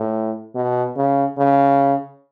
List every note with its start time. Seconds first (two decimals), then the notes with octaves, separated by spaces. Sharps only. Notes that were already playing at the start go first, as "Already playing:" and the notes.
Already playing: A2
0.55 B2
0.97 C#3
1.38 C#3